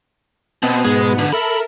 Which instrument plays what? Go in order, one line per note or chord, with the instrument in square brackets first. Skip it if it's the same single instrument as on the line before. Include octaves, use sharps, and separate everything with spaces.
[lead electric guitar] B2 [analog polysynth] B3 C4
[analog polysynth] G#2 B2 B3 [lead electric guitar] G#3
[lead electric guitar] D3
[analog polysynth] A4 A#4 E5 [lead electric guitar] B5